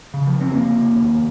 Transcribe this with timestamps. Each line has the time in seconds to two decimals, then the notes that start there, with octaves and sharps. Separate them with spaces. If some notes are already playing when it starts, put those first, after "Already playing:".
0.14 C#3
0.27 F3
0.40 F1 C4
0.54 A#3
0.68 F1
0.95 D#2